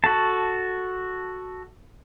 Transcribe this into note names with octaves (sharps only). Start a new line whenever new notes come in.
F#4 A4 A5